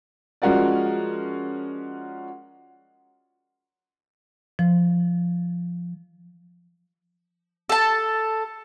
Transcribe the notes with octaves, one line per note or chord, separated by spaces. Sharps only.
F3 G#3 C#4 F#4 A#4 D5
F3
A4 A5